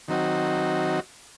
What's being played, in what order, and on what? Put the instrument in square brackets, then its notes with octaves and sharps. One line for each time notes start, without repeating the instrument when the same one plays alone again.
[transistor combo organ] D#3 F#3 C4 D#4 F#4